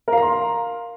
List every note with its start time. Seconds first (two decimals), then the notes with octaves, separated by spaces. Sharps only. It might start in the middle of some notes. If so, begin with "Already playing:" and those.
0.08 A#4
0.12 F5
0.17 A#5
0.22 C6